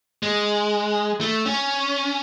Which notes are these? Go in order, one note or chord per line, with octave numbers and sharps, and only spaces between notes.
G#3
A3
C#4